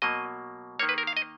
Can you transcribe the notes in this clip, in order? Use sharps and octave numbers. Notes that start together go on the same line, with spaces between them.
B2 F#3 A#3 D#5
D#3 A#3 C#5
B4
A#4
F5
D#5